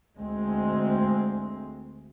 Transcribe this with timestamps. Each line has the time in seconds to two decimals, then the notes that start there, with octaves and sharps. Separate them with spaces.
0.18 D2 G#3 C4